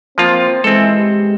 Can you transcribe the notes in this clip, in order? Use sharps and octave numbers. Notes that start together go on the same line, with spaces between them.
F3 A#3 C4 F4
E3 G#3 C4 A4
G4